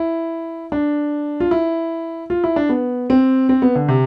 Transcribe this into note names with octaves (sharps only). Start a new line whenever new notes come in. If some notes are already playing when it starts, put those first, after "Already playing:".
Already playing: E4
D4
F4
E4
F4
E4
D4
B3
C4
C4
B3
D3
C3